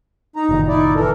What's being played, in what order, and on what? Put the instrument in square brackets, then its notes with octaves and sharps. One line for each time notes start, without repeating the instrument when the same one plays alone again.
[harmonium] D#4 A#5
[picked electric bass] F#1 A#2 D#3
[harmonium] D#4 E4 D5
E3 A4 A#4